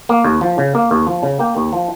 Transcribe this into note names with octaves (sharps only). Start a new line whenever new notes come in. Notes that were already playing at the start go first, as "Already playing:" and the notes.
A#3
D#2
F3
C#3
A#3
D#2
F3
C#3
A#3 G5
D#2
F3